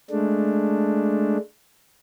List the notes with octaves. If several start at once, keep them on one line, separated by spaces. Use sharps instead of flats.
G#3 A3 D4